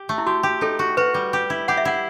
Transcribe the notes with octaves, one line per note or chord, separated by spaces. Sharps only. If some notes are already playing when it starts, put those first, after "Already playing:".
Already playing: G4
A3
E4
F#4 G4
G4
D#4 A4
F#4
F#4 B4
G3
G4
E4
G4 F#5
E5
E4 F#5